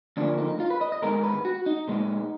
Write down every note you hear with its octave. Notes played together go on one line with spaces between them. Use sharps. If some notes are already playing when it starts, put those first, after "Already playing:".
D2 D3 F3 A#3 D4
D#4
F4
B4
D#5
D#5
G#2 D#3 G#3 B3 A#4
B4
F#4
D#4
A#2 G#3 B3